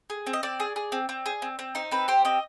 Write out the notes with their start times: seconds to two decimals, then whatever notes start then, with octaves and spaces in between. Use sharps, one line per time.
0.10 G#4
0.27 C4
0.33 D#5
0.43 C4 D5
0.60 G#4
0.76 G#4
0.92 C4
1.09 C4
1.26 G#4
1.42 C4
1.59 C4
1.75 D#4 C5
1.91 C4 B4
2.08 G4 C5
2.25 C4 D#5